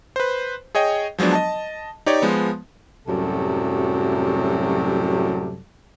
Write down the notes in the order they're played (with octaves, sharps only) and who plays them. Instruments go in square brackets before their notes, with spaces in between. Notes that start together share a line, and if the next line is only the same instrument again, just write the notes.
[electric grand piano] B4 C5
G#4 C#5 D#5 G5
F3 F#3 G#3 B3 D4
D#5 A5
D#4 G4 C#5 D5
F3 G#3 B3
[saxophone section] F#2 A2 C3 F#3 G3 A4